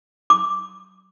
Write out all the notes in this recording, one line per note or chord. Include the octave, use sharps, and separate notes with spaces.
D6